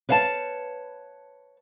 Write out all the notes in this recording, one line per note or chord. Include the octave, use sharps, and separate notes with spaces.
B4 C#5 F5 F#5 A5